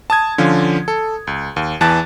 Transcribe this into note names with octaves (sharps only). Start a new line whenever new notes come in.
A5 D#6 G#6
D3 F3 C#4 F4
A4
C#2
D#2
E2 E3 A5 F#6 A6